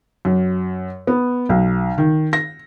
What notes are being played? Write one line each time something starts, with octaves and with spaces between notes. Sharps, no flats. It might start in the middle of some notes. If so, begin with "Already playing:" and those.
F#2
B3
B1
D#3
A#6